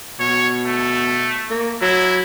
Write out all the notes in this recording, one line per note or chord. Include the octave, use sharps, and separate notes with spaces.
B2 C#5
A3
A#3
F#3 E4